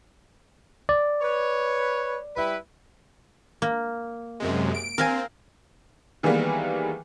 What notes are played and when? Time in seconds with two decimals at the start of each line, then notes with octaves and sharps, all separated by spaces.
0.89 D5
1.22 B4 C#5
2.36 G3 E4 B4
3.62 A#3
4.40 F#2 C3 G#3
4.74 D7
4.98 C4 A#4 F5 G#5
6.23 D#3 E3 G3 G#3 A#3 B3